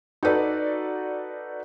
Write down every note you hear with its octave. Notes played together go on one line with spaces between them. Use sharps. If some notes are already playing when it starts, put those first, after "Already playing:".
D#4 F#4 A4 B4 D5